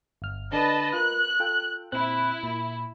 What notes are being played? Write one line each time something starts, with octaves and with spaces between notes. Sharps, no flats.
G1 F6
D3 D4 B4 D#5 A5
F4 A#4 F#6
F4 A4 G5
A#2 C4 E4 F#6
A#2